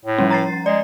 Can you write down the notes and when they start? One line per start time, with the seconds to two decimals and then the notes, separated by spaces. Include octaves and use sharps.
0.05 A2
0.18 F3 G3 C#4
0.31 A#5 A6 C7
0.66 G#3 D5